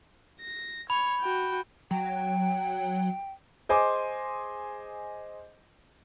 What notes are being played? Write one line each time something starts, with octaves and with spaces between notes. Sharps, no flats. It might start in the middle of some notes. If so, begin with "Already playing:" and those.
A#6
C#5 B5
F#4 G5
F#3 G5
G#4 C5 D#5 G#5 C6 D6